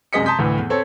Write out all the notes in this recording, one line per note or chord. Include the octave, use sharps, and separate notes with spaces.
C2 F#2 G#3 D#5 B6 C#7
A5 A#5 C6 D#6 G6 B6
D2 A2 E3
E2
C4 A4 C#5